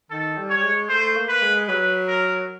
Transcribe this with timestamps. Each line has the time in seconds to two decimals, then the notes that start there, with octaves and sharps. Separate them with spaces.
0.11 D#3 A4
0.37 G3
0.50 C#5
0.56 G3
0.63 G#3
0.89 A3 C5
1.16 A#3
1.29 B4
1.42 G#3
1.68 F#3 B4
2.07 A#4